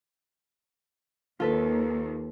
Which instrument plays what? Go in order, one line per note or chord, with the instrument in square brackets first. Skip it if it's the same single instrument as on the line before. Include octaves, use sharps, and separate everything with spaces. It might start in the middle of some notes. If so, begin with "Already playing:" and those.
[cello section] D#2 [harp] F4 A4 B4